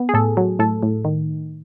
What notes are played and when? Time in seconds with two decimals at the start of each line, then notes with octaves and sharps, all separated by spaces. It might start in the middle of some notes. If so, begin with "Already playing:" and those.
Already playing: B3
0.09 G#4
0.14 A2 A4
0.37 F#3
0.59 A2 A4
0.83 A2
1.05 D#3